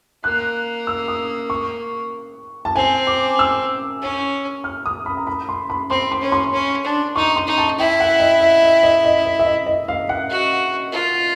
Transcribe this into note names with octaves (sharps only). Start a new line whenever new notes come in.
A#3 F#6
E6
D#6
C#6
A5
C4 G#5
D6
E6
C#4
F6
D#6
B5
A#5
B5
C6
B5
C4 C6
C6
C#4
C6
C#4
D4
D#4 C#6
C6
D#4
A5
E4 G5
F#5
D#5
E5
D#5
D#5
D#5
D#5
E5
D#5
D#5
F5
F#5
F#4
F4